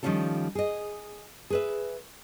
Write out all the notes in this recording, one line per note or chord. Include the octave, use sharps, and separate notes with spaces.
D#3 F3 G3 C#4 F4 A4
G#4 D#5
G#4 B4 E5